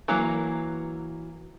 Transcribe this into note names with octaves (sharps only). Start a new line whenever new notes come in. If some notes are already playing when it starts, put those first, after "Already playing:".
E3 F#3 A#3